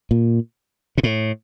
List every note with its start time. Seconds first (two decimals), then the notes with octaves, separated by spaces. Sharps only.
0.11 A#2
0.98 A#2
1.03 A2